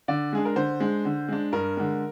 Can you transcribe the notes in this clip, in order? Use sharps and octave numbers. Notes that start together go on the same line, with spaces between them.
D3 D5
G#3 D4 G#4
A#4
D3 C5
G#3 D4
D3
G#3 D4
G2 A#4
D3 G#3